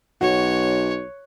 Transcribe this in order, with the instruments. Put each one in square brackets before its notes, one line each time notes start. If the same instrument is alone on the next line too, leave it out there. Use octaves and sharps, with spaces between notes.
[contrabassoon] B1 [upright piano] F#4 [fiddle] C#5